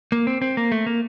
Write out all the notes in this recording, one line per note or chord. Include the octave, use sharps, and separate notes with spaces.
A#3
C4
C4
A#3
A3
A#3